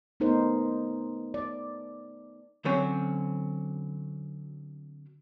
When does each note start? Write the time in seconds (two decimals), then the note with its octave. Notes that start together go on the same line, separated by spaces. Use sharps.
0.20 A3 B3 D#4 A#4 C5
1.34 D5
2.65 D3 F#3 C4 C#4